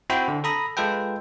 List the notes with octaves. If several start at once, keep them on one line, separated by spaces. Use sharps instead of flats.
C4 E4 F#4 C5 G5 B5
D3
A4 A#5 B5 D#6 A#6
G#3 F4 A4 B4 G5